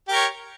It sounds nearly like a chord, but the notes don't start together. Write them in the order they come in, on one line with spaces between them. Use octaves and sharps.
G4 A#4 C#5